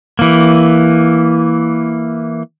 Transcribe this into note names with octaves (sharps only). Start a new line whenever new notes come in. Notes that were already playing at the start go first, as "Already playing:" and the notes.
E3 A#3